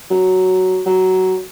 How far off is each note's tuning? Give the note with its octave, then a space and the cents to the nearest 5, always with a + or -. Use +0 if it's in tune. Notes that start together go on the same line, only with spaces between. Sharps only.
F#3 +5
F#3 +15